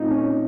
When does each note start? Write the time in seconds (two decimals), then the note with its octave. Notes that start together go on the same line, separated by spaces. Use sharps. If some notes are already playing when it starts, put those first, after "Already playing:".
Already playing: A#2 A3 C4 D#4 F4
0.11 C#4